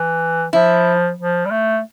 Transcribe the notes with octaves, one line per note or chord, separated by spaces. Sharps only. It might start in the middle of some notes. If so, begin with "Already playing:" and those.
Already playing: E3
F3 E4
F3
G3
A3